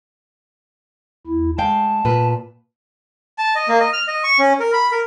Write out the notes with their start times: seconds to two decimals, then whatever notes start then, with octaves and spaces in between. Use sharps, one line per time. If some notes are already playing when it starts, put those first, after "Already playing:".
1.27 E2 E4
1.58 G#3 F5 G5 A5
2.05 A#2 B4
3.38 A5
3.55 D#5
3.68 A#3
3.80 D#5
3.93 F6
4.07 D#5
4.24 C#6
4.39 C#4
4.60 A#4
4.73 B5
4.92 A#4